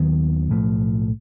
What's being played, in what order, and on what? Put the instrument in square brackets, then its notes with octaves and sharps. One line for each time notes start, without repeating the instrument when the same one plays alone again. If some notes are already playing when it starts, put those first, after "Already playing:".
Already playing: [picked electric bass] D#2 D#3 F#3 B3
B1 A2 F3 A3